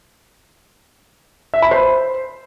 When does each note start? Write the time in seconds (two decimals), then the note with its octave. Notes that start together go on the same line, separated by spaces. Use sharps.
1.54 E5
1.62 B5
1.71 C5